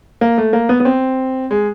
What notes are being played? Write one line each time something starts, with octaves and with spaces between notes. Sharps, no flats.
A#3
A3
A#3
B3
B3
C4
G#3